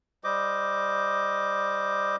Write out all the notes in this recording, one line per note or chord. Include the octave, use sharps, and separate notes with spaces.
G3 C5 D#5 D6